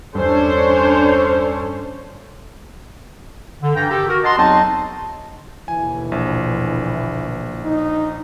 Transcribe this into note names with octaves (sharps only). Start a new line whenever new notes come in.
E2 G2 C#4 D4 A4 C5 C#5
D3
G2 E3 G5 A#5
D#3 G4 A4
F#4 A#4
D#5 F#5 A5 A#5 C6
E2 F#3 C4 D#4 D#5 A5
D#2 B2 D3 E3 G#5
A#1
D#4